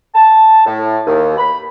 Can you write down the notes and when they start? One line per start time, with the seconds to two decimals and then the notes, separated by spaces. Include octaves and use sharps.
0.14 A5
0.66 A2
1.07 D#2
1.37 B5